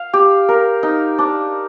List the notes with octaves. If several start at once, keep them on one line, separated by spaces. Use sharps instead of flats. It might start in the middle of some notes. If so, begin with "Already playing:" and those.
Already playing: F5
G4
A#4
D#4
D4